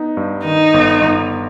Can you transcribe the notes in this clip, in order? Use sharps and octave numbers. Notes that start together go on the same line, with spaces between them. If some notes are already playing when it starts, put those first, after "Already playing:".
Already playing: B3 D#4
G2
D#3 D#4
G1
G1